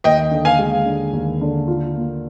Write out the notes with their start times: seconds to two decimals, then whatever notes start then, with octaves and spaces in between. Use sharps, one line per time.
0.04 D#2 D#5 G5
0.31 D3
0.45 F5 G#5
0.59 G#3
0.86 D3
1.13 D#2
1.41 D3
1.68 F4
1.95 A#3